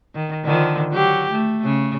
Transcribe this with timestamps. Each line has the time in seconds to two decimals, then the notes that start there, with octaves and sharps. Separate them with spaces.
0.15 D#3
0.45 D3 D#3 F3
0.91 F#3 G4
1.31 A3
1.64 C#3